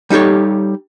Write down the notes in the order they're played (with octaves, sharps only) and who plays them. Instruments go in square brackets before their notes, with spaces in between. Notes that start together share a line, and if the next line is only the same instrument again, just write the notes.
[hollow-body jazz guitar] G3 D#4 G4 A4 C#5